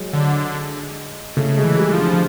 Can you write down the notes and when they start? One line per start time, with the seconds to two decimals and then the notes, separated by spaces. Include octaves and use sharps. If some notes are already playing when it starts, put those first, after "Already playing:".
Already playing: F#3 G#3
0.13 D3
1.37 C#3 A3
1.57 G#3
1.64 E3
1.79 G3
1.92 F3
1.98 D3